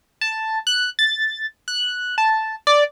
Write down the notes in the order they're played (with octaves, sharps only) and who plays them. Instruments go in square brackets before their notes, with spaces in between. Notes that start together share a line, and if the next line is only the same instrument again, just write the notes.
[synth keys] A5
F#6
A6
F#6
A5
D5